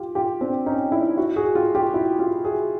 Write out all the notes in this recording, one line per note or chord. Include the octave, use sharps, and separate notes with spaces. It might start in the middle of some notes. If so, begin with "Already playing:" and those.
Already playing: F4 G4
F4 G4
C4 D4
C#4 D#4
D4 E4
E4 F#4
F#4 G#4
F4 G4
F4 G4
E4 F#4
F4 G4
F#4 G#4